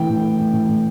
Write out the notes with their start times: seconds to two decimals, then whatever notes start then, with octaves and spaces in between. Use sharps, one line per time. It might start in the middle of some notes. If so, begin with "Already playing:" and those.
Already playing: E3 A3 G5
0.09 A2
0.23 A3
0.39 A2
0.54 A2
0.69 A2